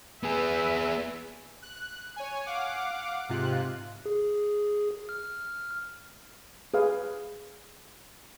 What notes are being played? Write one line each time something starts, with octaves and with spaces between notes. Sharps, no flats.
B3 G#4 B4 E5
F#6
C#5 G#5
F5 F#5 D6
G#2 C3 F4 F#6
G#4
F6
G#4 B4 F5 G#5